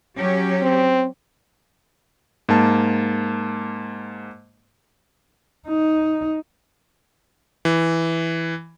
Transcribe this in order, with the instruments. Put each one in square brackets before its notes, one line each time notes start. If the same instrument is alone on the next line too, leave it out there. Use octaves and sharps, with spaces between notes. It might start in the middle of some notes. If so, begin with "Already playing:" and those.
[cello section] F#3 C#4 G4
[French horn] C4
[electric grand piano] G#2 A#3 A5
[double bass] D#4
[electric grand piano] E3